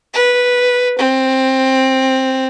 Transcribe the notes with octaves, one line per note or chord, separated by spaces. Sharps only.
B4
C4